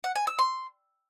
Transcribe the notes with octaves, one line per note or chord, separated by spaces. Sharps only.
F#5
G#5
E6
C6